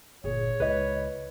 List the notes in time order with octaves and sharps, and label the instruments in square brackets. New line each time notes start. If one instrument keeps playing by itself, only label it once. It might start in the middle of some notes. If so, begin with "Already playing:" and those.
[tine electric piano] G1 A#2 [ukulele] G#4 [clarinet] C#5
[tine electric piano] C#2 E4 B5 [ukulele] B4 D#5